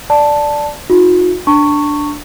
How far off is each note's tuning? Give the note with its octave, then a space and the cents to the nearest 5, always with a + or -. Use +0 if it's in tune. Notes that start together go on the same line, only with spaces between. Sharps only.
D5 +0 A5 +0
D#4 +20 F#4 -45
D4 +0 A5 +40 C#6 +0